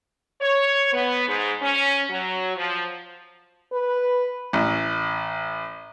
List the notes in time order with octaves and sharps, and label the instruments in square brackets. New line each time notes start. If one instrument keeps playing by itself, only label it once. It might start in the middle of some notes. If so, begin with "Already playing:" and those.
[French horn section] C#5
B3
G#2
C#4
F#3
F3
[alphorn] B4
[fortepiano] A1